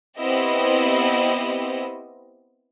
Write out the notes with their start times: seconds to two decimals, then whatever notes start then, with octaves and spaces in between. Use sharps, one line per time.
0.19 B3 C4 E4 G4 C5 D#5